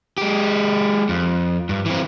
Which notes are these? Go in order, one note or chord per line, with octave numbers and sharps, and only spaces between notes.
G#3 G4
F2
G2
E3 C4